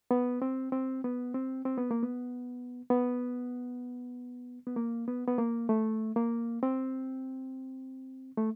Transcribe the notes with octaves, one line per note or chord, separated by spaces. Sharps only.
B3
C4
C4
B3
C4
C4
B3
A#3
B3
B3
B3
A#3
B3
B3
A#3
A3
A#3
C4
A3